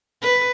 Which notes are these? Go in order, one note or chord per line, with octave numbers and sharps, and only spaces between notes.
B4